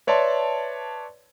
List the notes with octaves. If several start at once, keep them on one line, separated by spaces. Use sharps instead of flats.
B4 C#5 D5 E5 A5 C6